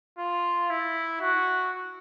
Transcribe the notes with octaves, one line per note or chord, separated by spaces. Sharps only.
F4
E4
F#4